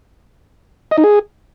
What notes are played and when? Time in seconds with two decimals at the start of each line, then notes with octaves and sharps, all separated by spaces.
0.91 D#5
0.98 D#4
1.04 G#4